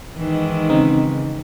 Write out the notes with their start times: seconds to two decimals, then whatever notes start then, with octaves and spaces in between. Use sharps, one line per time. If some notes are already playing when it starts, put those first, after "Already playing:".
0.16 G#2 D#3 E3
0.69 C#3 C4 D#4